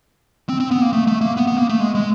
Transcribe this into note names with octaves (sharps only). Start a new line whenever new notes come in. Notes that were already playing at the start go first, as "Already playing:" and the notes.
C4
C4
B3
A#3
A3
A3
A#3
B3
B3
A#3
A3
G#3
G#3